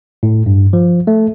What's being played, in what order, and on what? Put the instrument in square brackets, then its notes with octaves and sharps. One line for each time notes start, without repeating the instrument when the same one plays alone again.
[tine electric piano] A2
G2
F3
A3